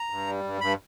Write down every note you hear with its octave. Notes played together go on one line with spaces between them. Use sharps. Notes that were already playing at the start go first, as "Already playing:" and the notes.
Already playing: A#5
G2
G3
G2
G2 B5